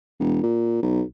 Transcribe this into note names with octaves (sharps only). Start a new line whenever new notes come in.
E1
A#2
B1